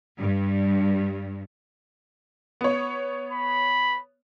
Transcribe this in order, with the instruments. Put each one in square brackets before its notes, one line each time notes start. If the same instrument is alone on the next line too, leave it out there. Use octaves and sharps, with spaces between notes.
[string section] G2
[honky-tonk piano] B3 C#5
[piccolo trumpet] B5